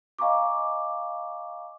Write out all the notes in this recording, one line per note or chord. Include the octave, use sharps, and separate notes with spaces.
D#5 F5 G#5 A#5 C#6 D6